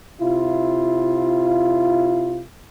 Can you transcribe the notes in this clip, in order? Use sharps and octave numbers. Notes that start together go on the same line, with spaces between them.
C3 E4 F4